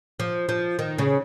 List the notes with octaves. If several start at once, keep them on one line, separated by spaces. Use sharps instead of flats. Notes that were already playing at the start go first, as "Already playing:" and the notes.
F3
F3
D#3
C#3